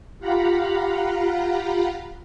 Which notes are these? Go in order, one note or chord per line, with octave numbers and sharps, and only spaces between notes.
F4 G4 F5 F#5 A#5 B5